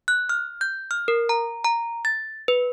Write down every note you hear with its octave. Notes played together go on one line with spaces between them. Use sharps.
F#6
F6
G6
F6
A#4
A#5
A#5
A6
B4